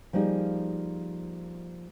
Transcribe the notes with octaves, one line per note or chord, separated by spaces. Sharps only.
F3 G3 A#3 D#4 G#4